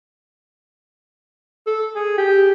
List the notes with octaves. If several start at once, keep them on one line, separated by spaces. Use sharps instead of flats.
A4
G#4
G4